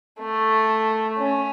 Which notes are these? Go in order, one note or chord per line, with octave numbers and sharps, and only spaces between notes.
A3
C#4